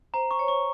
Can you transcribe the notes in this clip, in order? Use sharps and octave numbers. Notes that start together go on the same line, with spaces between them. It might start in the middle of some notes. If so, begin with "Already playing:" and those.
C5 A#5
C#6
C#5
C#6